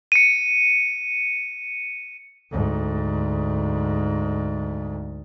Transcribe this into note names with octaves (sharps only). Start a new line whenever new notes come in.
C#7 D#7
D2 G#2